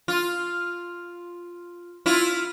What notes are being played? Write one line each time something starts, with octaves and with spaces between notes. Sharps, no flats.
F4
E4 F4